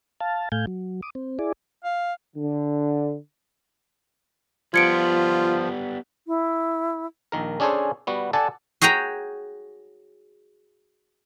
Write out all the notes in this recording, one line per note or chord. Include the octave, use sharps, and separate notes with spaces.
F5 A5
A2 A3 F5 G#5 G6
F#3
D6 D#6
C4
E4 G#4 D5
F5
D3
F3 G3 B3 F4 G#6 C#7 D7
E4
A#1 D#3 A#4
C#4 D4 G#4 A4 C5 C#5
G3 B3 F#4
A4 D5 F#5 G#5 A5
F#4 G#4 C#5 G5 A#5